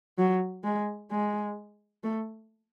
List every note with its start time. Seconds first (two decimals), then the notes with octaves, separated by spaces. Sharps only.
0.18 F#3
0.64 G#3
1.11 G#3
2.04 A3